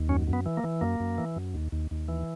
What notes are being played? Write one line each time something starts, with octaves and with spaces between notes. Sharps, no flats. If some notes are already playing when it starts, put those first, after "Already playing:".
Already playing: D#2
F#2 C#4
F#2
B3
E3
A#3
E3
F#2 A#3
F#2
E3
F#2
D#2
D#2
D#2
E3